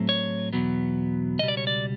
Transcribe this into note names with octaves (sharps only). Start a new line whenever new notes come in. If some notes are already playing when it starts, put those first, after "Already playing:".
Already playing: A2 F#3 A3 C4
C#5
E2 B2 F#3 B3
C#2 B2 G3 D#5
D5
C#5
D5